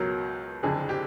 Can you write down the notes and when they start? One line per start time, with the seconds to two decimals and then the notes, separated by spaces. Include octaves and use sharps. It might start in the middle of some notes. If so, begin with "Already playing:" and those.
Already playing: C#2 B2 F#3 A#4
0.63 F#1 F2 D3 G#4
0.89 G4